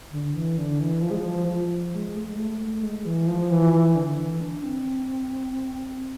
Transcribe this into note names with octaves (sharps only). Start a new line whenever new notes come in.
D3
E3
D3
E3
F3
G#3
F3
F3
G#3
A3
G#3
A3
A3
G#3
E3
F3
E3
E3
D3
E3
D4
C4